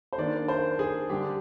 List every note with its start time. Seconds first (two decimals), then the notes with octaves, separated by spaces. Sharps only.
0.13 C5
0.18 D#3 A#3 D4 D5
0.48 C5
0.79 G#4
1.09 D3 G3 D4 G4